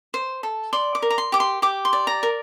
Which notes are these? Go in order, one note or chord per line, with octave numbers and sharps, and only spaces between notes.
C5
A4
D5 C6
D6
A#4
A#5
C6
G4 D6
C6
G4 D6
C6
D5
A#5
A#4